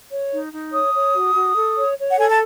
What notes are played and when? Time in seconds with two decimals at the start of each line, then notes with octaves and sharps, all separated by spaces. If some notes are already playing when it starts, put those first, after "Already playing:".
0.11 C#5
0.32 D#4
0.53 D#4
0.73 C#5 D#6
0.94 C#5
1.15 F#4
1.35 F#4
1.56 A4
1.77 C#5
1.98 C#5
2.11 F#5
2.18 A4 G#5
2.30 A5